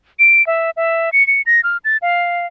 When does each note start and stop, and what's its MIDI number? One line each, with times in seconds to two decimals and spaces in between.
0.19 0.45 98
0.47 0.70 76
0.77 1.10 76
1.13 1.26 97
1.27 1.42 97
1.46 1.61 94
1.64 1.77 89
1.85 1.97 93
2.02 2.46 77